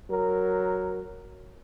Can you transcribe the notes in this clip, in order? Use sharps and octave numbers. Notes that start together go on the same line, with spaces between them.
F#3 A#4